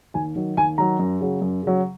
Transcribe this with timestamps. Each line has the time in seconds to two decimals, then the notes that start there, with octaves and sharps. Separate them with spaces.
0.14 D#2 G#5
0.36 D#3 F#3
0.57 D#2 G#5
0.78 D#3 F#3 A#5
0.99 F#2
1.21 C#3 F#3
1.41 F#2
1.62 C#3 F#3